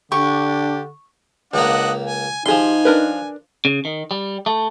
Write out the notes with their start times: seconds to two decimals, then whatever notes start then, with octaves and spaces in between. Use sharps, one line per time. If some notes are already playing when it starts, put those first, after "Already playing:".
0.12 D3 D4 G4 C#6
1.54 C#2 A#3 D4 D#5 F#5
2.06 G#5
2.46 F3 D#4 G4 G#4 G#5 C6
2.85 D4 A#4 B4
3.65 C#3
3.85 D#3
4.11 G3
4.46 A3